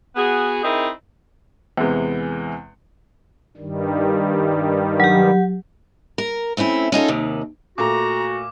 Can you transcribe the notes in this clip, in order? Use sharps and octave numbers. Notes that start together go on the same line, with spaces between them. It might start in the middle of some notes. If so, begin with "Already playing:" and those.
B3 F#4 G#4
C4 D#4 E4 G#4 A#4
E2 C3 G#3 B3
G2 D#3 G3
F#3 G4
A#4
A3 C4 C#4 E4
C#4 D#4 F4 A4
D#2 C3 D#3
A#2 A3 F#4 A#5 D6